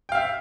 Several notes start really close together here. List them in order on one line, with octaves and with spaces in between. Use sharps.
G5 F5 E5